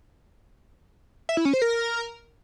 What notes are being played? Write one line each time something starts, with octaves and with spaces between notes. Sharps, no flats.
E5
E4
C#4
C5
A#4